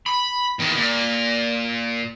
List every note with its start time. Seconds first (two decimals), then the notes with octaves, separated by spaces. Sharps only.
0.06 B5
0.59 E2 D#3
0.76 A#2